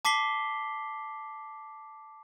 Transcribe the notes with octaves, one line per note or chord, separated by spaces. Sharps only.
A5 D6 B6 C7 G7